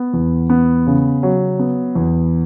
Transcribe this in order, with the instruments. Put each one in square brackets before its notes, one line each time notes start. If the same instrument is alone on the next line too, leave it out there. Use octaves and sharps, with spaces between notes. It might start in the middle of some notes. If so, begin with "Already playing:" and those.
Already playing: [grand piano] B3
E2
B3
C#3
F#3
B3
E2